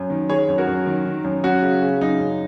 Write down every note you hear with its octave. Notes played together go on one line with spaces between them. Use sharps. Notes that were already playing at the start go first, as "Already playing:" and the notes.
Already playing: F#2
D#3
D#3 G#4 C#5
F#2
F#4 A#4
F#2
D#3
D#3
F#2
F#2 C#4 F#4
C#3
C#3
F#2 D#4
F#2